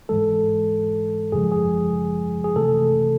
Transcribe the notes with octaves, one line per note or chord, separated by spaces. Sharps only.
G#2 E3 G#3 A4
F#2 C#3 F3 G#3 G#4
G#4
G#4
C3 E3 A3 A4